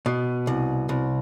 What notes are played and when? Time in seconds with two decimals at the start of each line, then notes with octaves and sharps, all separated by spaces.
0.06 B2
0.47 C2
0.89 C2